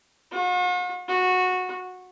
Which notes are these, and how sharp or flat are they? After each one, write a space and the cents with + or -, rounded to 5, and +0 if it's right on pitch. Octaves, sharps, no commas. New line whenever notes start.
F#4 -45
F#4 -15